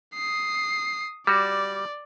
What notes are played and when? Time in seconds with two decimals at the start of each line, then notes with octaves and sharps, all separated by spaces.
0.15 D#6 C7
1.27 G3 F#4 D5